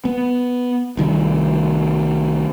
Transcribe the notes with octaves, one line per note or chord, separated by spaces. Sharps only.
B3
C2 D#3 G3